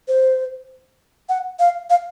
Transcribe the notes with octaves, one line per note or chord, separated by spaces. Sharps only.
C5
F#5
F5
F5